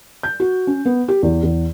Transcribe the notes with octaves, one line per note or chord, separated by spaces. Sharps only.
G6
F#4
C#4
B3
G4
E2
E2